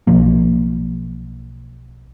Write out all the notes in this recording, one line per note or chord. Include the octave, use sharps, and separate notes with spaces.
B1 F3 A#3